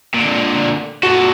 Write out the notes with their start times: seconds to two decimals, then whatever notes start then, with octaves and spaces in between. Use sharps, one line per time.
0.14 A#2 D3
1.03 A#2 F#4 A4